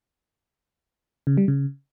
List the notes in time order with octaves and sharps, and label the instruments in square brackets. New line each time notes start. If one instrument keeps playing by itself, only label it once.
[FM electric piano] C#3
G3
C#3